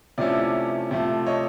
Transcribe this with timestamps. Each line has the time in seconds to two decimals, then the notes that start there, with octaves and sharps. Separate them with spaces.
0.18 C3 F3 A3 C#4 E4 D5
0.91 C3 F3 A3
1.26 C#5 D#5